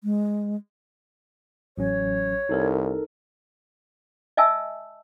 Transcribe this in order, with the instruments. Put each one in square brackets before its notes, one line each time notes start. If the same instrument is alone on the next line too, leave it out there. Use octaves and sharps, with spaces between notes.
[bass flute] G#3
[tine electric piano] A1 F#3 C#4 [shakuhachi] C#5
[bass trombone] C2 [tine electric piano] D#4 A4 A#4
[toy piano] D#5 E5 G#5 A5 E6